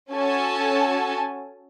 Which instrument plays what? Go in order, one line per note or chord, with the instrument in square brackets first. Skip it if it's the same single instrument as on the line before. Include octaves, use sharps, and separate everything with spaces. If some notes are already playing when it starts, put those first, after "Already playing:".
[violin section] C#4 F#4 A4 G#5 A5